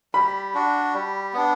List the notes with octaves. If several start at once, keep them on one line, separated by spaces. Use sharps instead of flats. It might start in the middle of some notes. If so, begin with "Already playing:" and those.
G3 B5
D4 F#4
G3
B3 D4